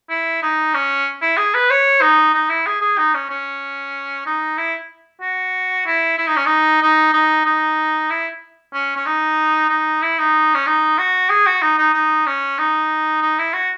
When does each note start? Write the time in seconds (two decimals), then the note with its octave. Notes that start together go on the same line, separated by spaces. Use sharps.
0.10 E4
0.42 D#4
0.74 C#4
1.22 E4
1.37 G#4
1.54 B4
1.70 C#5
2.01 D#4
2.34 D#4
2.49 E4
2.66 G#4
2.81 G#4
2.97 D#4
3.14 C#4
3.30 C#4
4.26 D#4
4.57 E4
5.21 F#4
5.86 E4
6.18 E4
6.27 D#4
6.36 C#4
6.46 D#4
6.82 D#4
7.13 D#4
7.46 D#4
8.10 E4
8.74 C#4
8.96 C#4
9.06 D#4
9.69 D#4
10.02 E4
10.18 D#4
10.54 C#4
10.66 D#4
10.98 F#4
11.30 G#4
11.46 F#4
11.62 D#4
11.78 D#4
11.94 D#4
12.26 C#4
12.58 D#4
13.22 D#4
13.38 E4
13.53 F#4